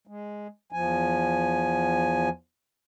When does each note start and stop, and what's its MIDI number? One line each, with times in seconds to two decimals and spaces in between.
0.07 0.47 56
0.72 2.29 40
0.72 2.29 53
0.72 2.29 80